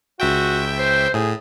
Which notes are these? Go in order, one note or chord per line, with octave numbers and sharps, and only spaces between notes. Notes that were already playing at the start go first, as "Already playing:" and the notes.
C#2 F#4 E5 G5
C5
A2 G#4